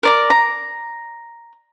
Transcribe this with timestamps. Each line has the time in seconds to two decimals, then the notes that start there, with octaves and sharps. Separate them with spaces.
0.03 A#4 D5 A#5
0.30 A#5